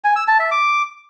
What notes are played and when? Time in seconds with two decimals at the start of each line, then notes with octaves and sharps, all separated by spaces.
0.04 G#5
0.16 E6
0.28 A5
0.39 E5
0.51 D6